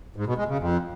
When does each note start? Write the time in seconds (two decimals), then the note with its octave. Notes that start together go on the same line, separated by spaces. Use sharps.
0.16 G#2
0.27 B2
0.38 G#3
0.48 C#3
0.59 F2